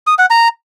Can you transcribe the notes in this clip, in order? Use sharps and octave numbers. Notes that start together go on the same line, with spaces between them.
D#6
F#5
A#5